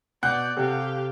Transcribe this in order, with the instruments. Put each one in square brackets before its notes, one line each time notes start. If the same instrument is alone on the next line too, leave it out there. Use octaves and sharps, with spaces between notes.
[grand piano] B2 [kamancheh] D5 [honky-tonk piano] F#5 F#6 G6
[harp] C3 [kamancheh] G4 F5 [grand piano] A4